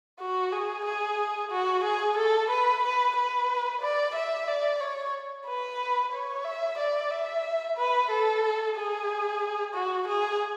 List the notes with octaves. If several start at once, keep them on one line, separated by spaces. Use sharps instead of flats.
F#4
G#4
G#4
F#4
G#4
A4
B4
B4
B4
D5
E5
D5
C#5
B4
C#5
E5
D5
E5
B4
A4
G#4
F#4
G#4